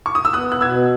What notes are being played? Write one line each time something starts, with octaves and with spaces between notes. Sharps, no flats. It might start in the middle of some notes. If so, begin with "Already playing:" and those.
C#6
D#6
E6
B3 D#6 F#6
F#6
B2 E6 G#6